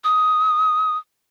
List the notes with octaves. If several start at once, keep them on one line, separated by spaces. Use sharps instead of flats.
D#6